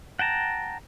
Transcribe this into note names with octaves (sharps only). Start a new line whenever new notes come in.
F#5 G5 A5 A#5